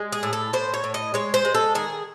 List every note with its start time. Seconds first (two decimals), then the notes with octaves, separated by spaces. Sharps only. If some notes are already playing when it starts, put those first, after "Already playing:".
Already playing: G#3
0.13 G#4
0.23 A2
0.33 A4
0.53 A2 C5
0.74 C#5
0.84 A2
0.94 D#5
1.14 G#3 C#5
1.34 C5
1.45 G#3
1.55 A4
1.75 D#3 G#4